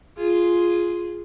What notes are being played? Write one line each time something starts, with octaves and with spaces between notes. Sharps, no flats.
F4 G#4